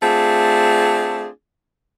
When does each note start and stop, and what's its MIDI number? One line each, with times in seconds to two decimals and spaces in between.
0.03 1.28 57
0.03 1.28 60
0.03 1.28 62
0.03 1.28 65
0.03 1.28 68